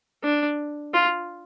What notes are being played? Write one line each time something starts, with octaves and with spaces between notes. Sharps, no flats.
D4
F4